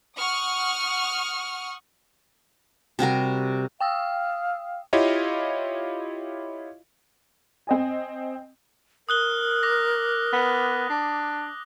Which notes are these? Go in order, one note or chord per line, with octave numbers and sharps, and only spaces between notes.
F#5 C#6 D#6 F6
C3 G3 F#4 A#4
F5 G5 D#6 E6
E4 F4 G4 C#5 D#5 F5
C4 D#5 G#5
A#4 D#6 F#6 G7
D6 A#6
B3
D4